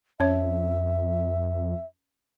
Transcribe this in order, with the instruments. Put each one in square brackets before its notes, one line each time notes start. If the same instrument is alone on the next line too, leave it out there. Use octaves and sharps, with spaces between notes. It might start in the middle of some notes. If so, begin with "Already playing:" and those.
[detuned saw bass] F2 [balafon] C#4 C#5 [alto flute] E5